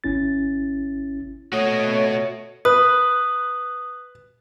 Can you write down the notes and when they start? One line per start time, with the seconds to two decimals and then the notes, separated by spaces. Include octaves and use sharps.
0.04 G#1 C#4 E4 A6
1.53 A3 F#4 C#5 D#5
2.65 B4 D#6